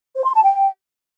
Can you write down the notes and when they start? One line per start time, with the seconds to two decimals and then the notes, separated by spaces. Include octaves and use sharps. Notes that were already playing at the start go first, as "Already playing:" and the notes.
0.17 C5
0.26 C6
0.34 A5
0.43 G5